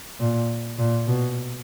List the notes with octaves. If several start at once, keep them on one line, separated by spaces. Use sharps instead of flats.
A#2
A#2
B2